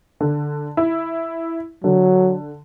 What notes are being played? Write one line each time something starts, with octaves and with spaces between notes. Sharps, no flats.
D3
E4
D3 F#3